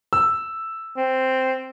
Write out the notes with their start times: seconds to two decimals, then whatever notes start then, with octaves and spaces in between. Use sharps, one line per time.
0.13 E6
0.97 C4